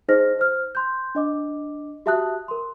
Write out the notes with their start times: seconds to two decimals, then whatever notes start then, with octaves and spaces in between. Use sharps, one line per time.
0.09 D#4 G#4 C5 D#5 F6 A#6
0.39 C5 F6
0.75 C6 F#6 G6
1.15 D4 D#5 D6
2.06 F#4 G4 E5 A5 D#6 F#6
2.48 A#4 C6